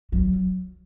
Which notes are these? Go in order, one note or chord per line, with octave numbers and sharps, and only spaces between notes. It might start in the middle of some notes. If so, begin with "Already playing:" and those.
F#3